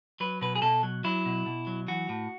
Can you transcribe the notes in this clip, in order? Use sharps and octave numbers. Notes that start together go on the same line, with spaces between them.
F#3 B4
B2 B4
G#4
B2 A4
F#3
F#3 E4
B2
B2
F#3
E3 F#4
A2